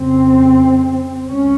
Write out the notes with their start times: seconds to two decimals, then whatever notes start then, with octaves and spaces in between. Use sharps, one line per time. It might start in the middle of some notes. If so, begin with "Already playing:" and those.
Already playing: F2 C#3 C4
1.27 C#2 C3 C#4